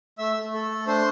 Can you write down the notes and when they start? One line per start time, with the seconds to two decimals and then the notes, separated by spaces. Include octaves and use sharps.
0.18 A3 E5 E6
0.36 A3
0.54 A4
0.70 A3
0.87 D4 C5 C6